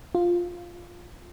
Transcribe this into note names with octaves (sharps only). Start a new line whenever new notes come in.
F4